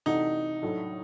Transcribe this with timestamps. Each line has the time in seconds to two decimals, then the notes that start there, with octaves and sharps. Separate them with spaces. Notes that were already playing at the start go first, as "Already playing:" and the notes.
0.06 C3 E3 A3 D4 D#4 F#4
0.62 A2 F#3 A3 D4